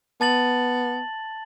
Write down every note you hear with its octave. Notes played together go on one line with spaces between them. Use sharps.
B3 A5 A6 F#7